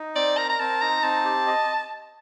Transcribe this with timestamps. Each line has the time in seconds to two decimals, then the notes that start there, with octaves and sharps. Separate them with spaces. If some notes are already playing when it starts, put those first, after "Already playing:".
Already playing: D#4
0.15 C4 D5
0.37 A#4 A#5
0.50 A#5
0.59 C4 A5
0.81 D#4 A#5
1.03 C4 A5
1.25 G4
1.47 D#5